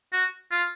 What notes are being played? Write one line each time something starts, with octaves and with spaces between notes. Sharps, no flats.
F#4
F4